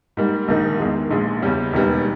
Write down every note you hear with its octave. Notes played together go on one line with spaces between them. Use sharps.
G#2 G3 A#3
A#1 G#2 D#3 A#3 D#4
E2 D#3 G#3
A#1 A#2 G#3
E2 C#3 G3 C#4
E1 D#2 D#3 G3 B3